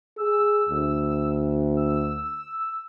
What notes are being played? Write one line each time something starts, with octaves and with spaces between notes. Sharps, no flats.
G#4 E6
D2
E6